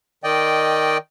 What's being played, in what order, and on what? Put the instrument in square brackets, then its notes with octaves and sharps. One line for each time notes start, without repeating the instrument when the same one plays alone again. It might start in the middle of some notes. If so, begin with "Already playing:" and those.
[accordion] D#3 D5 D#5 G5